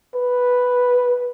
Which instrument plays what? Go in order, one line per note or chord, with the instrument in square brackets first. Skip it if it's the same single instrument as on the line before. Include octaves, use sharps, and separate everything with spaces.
[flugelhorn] B4